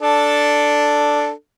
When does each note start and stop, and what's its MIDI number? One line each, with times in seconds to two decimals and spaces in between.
0.01 1.31 62
0.01 1.31 69